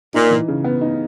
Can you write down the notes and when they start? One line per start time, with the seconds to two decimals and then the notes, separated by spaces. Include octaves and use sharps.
0.14 A#2 D#4
0.31 E3
0.48 C#3
0.64 B3
0.81 D#4